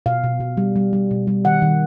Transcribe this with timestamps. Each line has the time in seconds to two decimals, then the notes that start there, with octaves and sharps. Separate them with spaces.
0.06 B2 F5
0.24 B2
0.40 B2
0.57 G3
0.76 G3
0.93 G3
1.11 B2
1.27 G3
1.45 D#3 F#5
1.62 D#3